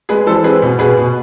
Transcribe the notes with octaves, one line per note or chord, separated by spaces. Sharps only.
G#3 G#4 B4
E3 A4 C5
C4 G#4 B4
B2
B2 G#4 B4
B2